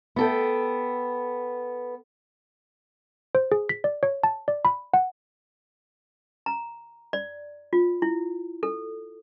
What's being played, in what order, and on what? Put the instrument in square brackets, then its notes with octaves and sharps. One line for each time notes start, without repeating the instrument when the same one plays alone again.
[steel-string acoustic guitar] B3 A4 G5
[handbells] C5
G#4
B6
D5
C#5
A5
D5
B5
F#5
[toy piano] A#5
D5
F4
E4
A4